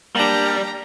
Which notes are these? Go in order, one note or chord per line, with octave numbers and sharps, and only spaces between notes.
G3 A#3 D4 G4 A#5